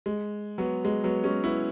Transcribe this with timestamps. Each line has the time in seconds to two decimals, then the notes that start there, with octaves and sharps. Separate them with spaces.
0.06 G#3
0.58 F#3 B3
0.85 G#3
1.04 F#3 B3
1.24 G#3 C#4
1.44 B3 E4